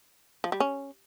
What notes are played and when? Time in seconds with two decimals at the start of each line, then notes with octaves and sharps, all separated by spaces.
0.44 F3
0.52 G3
0.60 C#4